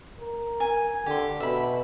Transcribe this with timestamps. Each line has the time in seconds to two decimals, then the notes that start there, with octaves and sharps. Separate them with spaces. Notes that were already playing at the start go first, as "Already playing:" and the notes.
0.20 A#4
0.60 G#5
1.06 D3 G4 C6
1.40 B2 E5 B5